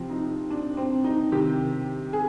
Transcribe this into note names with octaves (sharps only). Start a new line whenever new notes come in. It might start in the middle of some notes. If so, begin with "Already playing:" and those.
Already playing: C3 F3 C4
D#4
D4
C4
D#4
C3 D#3 G4
G#4